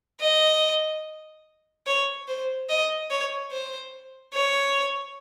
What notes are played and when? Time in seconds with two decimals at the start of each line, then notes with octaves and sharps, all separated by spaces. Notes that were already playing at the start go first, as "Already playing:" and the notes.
0.21 D#5
1.86 C#5
2.27 C5
2.69 D#5
3.10 C#5
3.51 C5
4.33 C#5